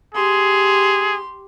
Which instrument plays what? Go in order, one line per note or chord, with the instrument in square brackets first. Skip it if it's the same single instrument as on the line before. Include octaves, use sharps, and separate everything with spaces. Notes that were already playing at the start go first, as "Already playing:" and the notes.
[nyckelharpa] G4 C6 [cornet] G#4